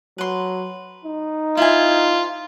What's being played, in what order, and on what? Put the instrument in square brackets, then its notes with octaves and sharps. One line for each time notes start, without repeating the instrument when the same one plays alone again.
[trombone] F#3 [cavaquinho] B4 C6
[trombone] D#4
[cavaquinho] E4 C5 G#5 [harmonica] F4